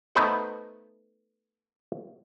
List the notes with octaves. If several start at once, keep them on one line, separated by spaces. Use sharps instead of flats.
A3 B3 D#4 B4 C5 F#5